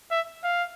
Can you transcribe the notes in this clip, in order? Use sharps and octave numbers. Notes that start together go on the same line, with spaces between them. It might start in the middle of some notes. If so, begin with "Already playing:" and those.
E5
F5